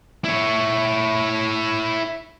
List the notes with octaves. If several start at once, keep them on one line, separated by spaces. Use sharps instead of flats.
E4 C#5